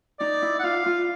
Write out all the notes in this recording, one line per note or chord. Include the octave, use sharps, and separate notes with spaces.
D#4 D5
E4
F#5
F4 F5
F4